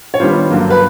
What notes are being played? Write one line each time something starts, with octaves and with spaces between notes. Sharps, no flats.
C#5
D#3 G3 B3 D4 F4 C5
G2 D3 F#3 A#3
B4